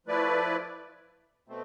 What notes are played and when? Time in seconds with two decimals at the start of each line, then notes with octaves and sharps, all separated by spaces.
0.07 F3 A3 E4 B4 D5
1.48 B2 A3 C4